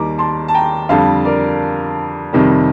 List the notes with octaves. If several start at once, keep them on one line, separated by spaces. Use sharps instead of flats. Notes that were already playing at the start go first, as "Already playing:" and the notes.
Already playing: D#2 D#3 G3 A#5 D6
A5 C6
A5
G5 A#5
F2 D3 G3 F5 A5
A#4 D5
F2 C3 D#3 G3